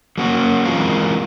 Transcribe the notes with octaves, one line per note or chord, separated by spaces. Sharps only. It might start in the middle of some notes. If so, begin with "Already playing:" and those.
F#3 A#3 C#4 F#4
E3 G#3 C4 F4 A#4